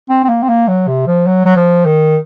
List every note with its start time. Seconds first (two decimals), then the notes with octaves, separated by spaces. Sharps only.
0.09 C4
0.24 C4
0.29 A#3
0.43 C4
0.49 A#3
0.68 F#3
0.88 C3
1.07 F3
1.27 F#3
1.45 F#3
1.56 F3
1.86 D#3